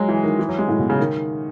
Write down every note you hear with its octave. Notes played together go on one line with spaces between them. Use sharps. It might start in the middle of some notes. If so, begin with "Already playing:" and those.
Already playing: F#3 G#3
E3
D#3
E3
F#3
G#3
A2
B2
C#3
D#3